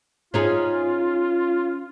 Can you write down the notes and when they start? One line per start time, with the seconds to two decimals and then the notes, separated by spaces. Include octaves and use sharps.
0.34 C#4 D#4 F4 G#4